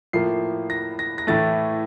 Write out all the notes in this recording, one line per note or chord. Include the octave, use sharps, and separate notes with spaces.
A2 F3 A#3 C7
A#6
A#6
A#6
A2 E3 A3 A6